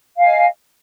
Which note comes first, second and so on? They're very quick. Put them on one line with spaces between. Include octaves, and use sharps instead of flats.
F5 G#5 D#5